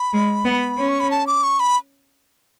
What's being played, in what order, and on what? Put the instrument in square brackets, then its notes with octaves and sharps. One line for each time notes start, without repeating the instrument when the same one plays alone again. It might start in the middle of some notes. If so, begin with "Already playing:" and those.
Already playing: [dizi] B5
[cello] G#3
B3
C#4
[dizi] C#6
B5
A5
D6
C#6
B5